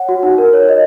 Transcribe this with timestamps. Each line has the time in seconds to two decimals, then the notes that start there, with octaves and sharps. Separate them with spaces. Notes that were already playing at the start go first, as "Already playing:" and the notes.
Already playing: C#5 F#5
0.09 F#4
0.23 D#4
0.38 A#4
0.53 C#5
0.69 D#5